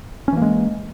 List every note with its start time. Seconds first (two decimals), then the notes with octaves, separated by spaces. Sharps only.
0.28 C#4
0.33 E3
0.37 A#3
0.42 G#3